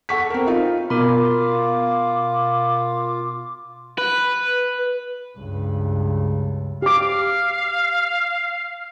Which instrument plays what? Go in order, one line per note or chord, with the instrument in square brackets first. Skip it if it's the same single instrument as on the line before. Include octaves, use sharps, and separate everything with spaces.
[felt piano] A4 F#5 C#6 B6
C4 A#4
D#4 F4
[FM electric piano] B2 [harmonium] F4 [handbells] A#4 B5 [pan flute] D6
[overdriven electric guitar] B4
[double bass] C#2 G2
[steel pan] G4 D6 [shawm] F5